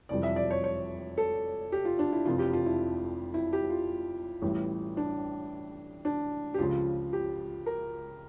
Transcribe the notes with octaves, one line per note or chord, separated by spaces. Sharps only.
F1 F2 E3 G3 D5
E5
D5
C#5
C#5
A4
G4
F4
D4
E4
F1 F2 E3 F4
G4
F4
E4
E4
G4
F4
A1 A2 E3 G3
D4
D4
G4
C#2 C#3 F3 F4
G4
A#4